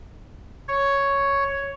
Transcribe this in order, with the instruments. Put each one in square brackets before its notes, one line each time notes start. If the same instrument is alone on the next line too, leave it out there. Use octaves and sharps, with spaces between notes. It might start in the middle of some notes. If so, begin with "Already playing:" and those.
[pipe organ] C#5